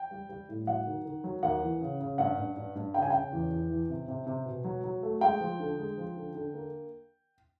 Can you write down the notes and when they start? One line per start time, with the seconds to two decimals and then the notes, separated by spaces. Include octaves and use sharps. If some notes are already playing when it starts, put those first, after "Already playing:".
Already playing: G5
0.11 G3
0.29 G3
0.49 A2
0.67 F#3 F#5
0.87 D#3
1.05 D#3
1.24 F#3
1.43 D#2 F#5
1.62 E3
1.81 C#3
2.00 C#3
2.18 G2 F#5
2.38 G2
2.57 G2
2.75 G2
2.94 C#3 G5
3.02 G#5
3.10 C#3 G5
3.33 E2
3.51 E2
3.70 E3
3.89 C3
4.08 C3
4.27 C3
4.46 B2
4.64 F#3
4.84 F#3
5.03 A3
5.21 G#3 G5
5.41 F3
5.60 D3
5.79 G#3
5.97 F3
6.16 D3
6.35 D3
6.54 A#3